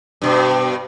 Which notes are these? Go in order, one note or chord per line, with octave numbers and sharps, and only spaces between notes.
G2 B2